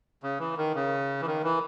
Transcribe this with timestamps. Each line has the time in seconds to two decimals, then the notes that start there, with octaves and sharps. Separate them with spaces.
0.23 C#3
0.39 E3
0.57 D#3
0.75 C#3
1.21 E3
1.26 D#3
1.44 E3